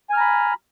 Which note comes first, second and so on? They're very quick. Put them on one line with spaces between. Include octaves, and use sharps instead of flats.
G#5 F6 A#5 B5